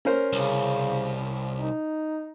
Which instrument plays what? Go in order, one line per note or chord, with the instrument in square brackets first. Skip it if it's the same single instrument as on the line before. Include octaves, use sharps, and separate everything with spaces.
[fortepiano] C#4 A#4 C5
[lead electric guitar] C2 [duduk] C#3
[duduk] D#4